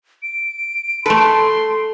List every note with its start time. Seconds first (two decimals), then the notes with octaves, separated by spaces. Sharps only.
0.23 D7
1.06 A3 A4 B4 C6